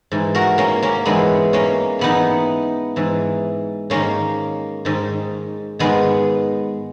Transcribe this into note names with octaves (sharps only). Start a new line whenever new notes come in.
G#2 E3
F#4 A#4
A#3 C#4
A#3 C#4
G#2 E3 G#3 B3
A#3 C#4
G#2 E3 B3 D#4
G#2 E3
G#2 D#3 A#3 C#4
G#2 D#3
G#2 D#3 G#3 B3